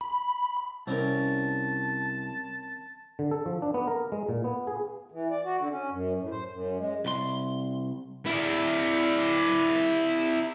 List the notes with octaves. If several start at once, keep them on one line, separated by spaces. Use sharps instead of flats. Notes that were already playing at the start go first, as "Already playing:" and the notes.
B5
C2 C4 C#4 A#4 A5
D3
A4
F3
D4
B3
A#4
G#3
A#2
B3
G#4
E3
D5
F#4
D3
C#4
F#2
A2
C5
F#2
G#3
C2 C6
E4 D5